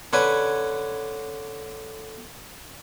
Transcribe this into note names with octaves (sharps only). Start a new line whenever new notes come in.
D3 C#4 B4 G#5